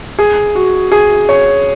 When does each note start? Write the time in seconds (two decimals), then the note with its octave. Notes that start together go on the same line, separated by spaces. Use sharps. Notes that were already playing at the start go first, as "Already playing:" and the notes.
0.19 G#4
0.55 F#4
0.92 G#4
1.29 C#5